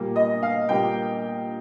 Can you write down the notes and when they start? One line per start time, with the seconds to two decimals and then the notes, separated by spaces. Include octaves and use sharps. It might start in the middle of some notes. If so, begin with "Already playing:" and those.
Already playing: A#2 G3 A#3
0.16 D#5
0.43 F5
0.69 A#2 G3 A#3 G5